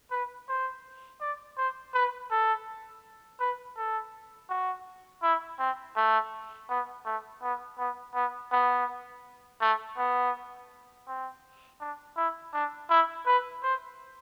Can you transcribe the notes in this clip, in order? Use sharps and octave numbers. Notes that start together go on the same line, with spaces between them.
B4
C5
D5
C5
B4
A4
B4
A4
F#4
E4
C4
A3
B3
A3
B3
B3
B3
B3
A3
B3
C4
D4
E4
D4
E4
B4
C5